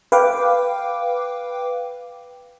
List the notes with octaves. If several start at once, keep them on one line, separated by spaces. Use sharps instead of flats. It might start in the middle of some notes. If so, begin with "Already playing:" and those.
B4 F5 G5 D6